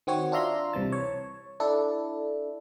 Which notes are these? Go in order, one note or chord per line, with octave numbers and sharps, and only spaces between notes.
D#3 C4 F#4 C#5
D4 F4 E5 A#5 C6
C2 C3 E3 A5
C#5
D4 E4 A4